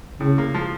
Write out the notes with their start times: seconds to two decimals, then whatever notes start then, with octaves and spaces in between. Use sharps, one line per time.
0.20 A2 C#3
0.38 A#3
0.54 F3